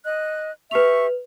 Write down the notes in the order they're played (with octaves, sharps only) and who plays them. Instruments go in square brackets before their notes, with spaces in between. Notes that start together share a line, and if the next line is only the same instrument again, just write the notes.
[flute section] D#5 F#6
[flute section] G4 E5 C#6 [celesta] B4 F7